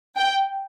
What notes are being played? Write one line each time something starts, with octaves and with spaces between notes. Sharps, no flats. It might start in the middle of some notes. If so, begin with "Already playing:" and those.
G5